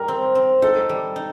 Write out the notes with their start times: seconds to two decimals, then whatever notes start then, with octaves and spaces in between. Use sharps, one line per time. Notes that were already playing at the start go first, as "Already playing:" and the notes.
Already playing: G3 D#4 A#4
0.08 C4
0.35 C4
0.62 D#4 A4
0.89 G3
1.16 D#4